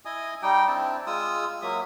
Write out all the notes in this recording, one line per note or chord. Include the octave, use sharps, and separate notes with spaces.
E4 D#5 G#5 D#6
G3 D#4 G4 G5
C4 D4 E4 A5
G#3 F4 D#6 E6
F#3 A#3 E5 D#6